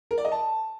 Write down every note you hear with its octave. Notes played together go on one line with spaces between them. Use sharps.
A#4
D5
D#5
A5